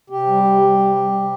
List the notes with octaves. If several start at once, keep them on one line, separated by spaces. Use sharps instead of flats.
C3 G4
G3
C3
G3
C3
G3
C3